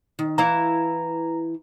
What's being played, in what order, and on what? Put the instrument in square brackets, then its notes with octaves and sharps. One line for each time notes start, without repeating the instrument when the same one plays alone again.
[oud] D#3
[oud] E3 E4 F5 [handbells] A#5